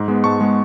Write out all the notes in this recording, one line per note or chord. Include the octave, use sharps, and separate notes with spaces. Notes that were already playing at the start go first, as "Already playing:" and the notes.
Already playing: G#2
G#3 B3
G#2 A5 C#6
G#3 B3